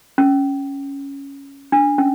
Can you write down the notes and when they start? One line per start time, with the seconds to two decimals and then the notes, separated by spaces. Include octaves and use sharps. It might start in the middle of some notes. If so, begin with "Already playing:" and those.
0.18 C#4
1.72 D4
1.98 C#4